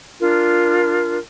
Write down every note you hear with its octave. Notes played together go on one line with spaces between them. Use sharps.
D4 F4 A#4